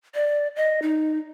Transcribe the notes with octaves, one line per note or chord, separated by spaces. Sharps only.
D5
D#5
D#4